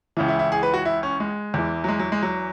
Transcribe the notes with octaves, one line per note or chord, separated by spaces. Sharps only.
C#2 C#3 E3
E4
E4
G#4
B4
F#4
E4
C#4
G#3
E2 E3
F#3
G#3
F#3
G#3
F#3